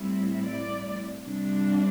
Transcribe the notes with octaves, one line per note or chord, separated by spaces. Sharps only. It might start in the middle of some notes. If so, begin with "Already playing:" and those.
Already playing: A2 G3 C4 E4
D5
C3 G3 D4